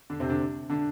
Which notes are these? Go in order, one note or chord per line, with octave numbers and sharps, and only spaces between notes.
D3 D4
C3 C4
D3 D4
D3 D4